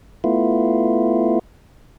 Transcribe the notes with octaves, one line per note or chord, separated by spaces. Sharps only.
A3 B3 E4 F4